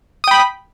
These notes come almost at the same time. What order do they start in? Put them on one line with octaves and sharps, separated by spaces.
D#6 G5 B5